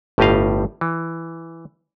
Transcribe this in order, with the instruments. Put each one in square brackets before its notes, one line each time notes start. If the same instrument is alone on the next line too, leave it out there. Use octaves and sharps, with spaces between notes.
[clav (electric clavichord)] G1 A2 G3 G4 D#5 F5
E3